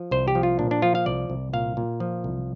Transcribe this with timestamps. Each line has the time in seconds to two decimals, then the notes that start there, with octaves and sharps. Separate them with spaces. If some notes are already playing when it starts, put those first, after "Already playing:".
Already playing: F3
0.11 C2 C5
0.28 G4
0.35 F3
0.43 F4
0.59 A#2 D4
0.71 D4
0.82 F3 F4
0.95 F5
1.06 C2 D5
1.30 C2
1.53 A#2 F5
1.77 A#2
2.00 F3
2.24 C2